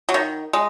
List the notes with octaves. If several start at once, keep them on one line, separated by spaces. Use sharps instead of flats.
F#3
D#3
G#3